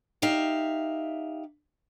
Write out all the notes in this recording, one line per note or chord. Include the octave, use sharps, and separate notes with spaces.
D#4 G4 E5 F5